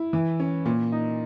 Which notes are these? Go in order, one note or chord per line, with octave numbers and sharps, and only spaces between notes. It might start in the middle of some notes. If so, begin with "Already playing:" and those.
Already playing: E4
E3
C#4
A#2
D#4